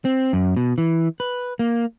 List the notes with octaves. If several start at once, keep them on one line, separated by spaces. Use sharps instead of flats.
C4
F#2
B2
E3
B4
A#3